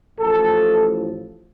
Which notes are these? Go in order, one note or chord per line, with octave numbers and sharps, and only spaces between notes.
A1 A2 F3 A4